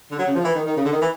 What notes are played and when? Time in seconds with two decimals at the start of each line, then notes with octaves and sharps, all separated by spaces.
0.11 D3
0.19 F#3
0.27 C#3
0.35 F3
0.44 E3
0.55 D#3
0.66 D#3
0.77 C#3
0.85 D3
0.92 D#3
1.01 E3